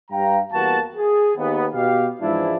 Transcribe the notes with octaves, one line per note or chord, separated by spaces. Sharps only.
G2 F5 G5 A#5
E2 G3 A#3 B3 F#4 A5
G#4
D#2 B3
B2 G4 F5
G#2 E3 F3 G#3 D4 E4